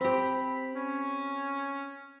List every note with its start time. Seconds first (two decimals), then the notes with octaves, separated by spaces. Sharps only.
0.01 C4 G4 B5
0.75 C#4